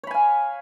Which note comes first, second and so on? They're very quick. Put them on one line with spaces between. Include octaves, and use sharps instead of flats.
C#5 B5 G#5 F5